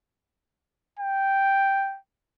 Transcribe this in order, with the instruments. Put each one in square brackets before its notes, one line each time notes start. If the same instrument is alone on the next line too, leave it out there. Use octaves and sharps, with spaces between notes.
[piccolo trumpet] G5